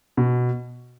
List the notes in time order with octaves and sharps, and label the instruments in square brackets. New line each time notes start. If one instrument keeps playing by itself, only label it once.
[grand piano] B2